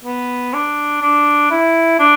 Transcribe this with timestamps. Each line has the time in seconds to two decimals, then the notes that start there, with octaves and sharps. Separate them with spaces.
0.05 B3
0.54 D4
1.02 D4
1.51 E4
1.99 D4